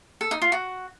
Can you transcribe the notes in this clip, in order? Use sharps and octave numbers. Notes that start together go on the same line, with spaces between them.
A4
D#4
F4
F#4